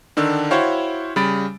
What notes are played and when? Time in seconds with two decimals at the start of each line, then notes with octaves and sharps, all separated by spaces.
0.17 D3 D#3 D4 E6
0.50 E4 F#4 C5 C#5 F5 G5
1.16 C#3 G3 B5 A6 D7